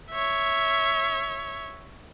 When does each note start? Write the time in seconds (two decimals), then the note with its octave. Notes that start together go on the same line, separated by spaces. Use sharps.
0.11 C#5 E5